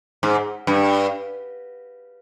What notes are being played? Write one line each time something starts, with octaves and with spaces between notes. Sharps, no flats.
G#2
G2